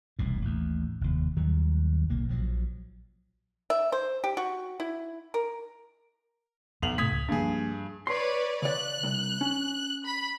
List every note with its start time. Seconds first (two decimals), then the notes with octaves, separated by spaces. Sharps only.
0.19 E1 C2 A2
0.42 A1 D#2
1.01 F1 D#2
1.36 D#2 D#3 F#3 G3
2.09 D1 B1 A#3
2.29 A#1 F3 F#3
3.70 E5
3.92 C5
4.24 G4
4.37 F#4
4.80 E4
5.34 A#4
6.82 B1 F2 F7 F#7
6.98 A2 C3 A3 D#6 G#6 B6
7.11 C#2
7.29 G2 F3 A#3 D4 G#4
8.07 B4 C#5 D5 C6
8.62 C#3 D5 F#6
9.03 C2
9.41 C#4
10.05 B5